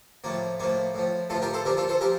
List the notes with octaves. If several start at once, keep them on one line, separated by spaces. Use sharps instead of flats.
A2 F3 A#3
A2 F3 A#3
A2 F3
A2 F3 F4 A4
G4 A#4
A4 C5
A#2 F3 G4 A#4
F4 A4
A4 C5
F3 G4 A#4